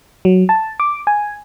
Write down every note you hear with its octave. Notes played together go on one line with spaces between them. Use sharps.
F#3
A5
D6
G#5